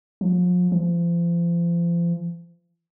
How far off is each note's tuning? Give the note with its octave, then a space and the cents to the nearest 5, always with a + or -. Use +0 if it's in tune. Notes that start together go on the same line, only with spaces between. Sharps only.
F3 +40
F3 -35